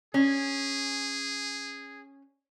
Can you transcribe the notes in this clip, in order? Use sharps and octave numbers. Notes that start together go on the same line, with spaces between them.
C#4 G#4